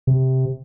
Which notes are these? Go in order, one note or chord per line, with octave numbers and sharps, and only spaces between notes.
C3